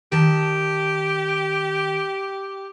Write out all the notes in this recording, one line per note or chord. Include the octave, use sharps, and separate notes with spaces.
D#3 G4 A5